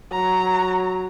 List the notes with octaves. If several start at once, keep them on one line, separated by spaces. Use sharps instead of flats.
F#3 A#5